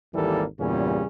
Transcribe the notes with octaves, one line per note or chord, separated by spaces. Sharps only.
G#1 D#2 E3 G3 A#3 A4
E2 G2 A#2 C#3 G3 C#4